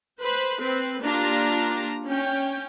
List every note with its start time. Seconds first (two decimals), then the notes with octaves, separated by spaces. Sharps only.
0.22 B4 C5
0.61 C4 B4
1.03 A#3 D4 F4 G4 A#5
2.06 C#4 G5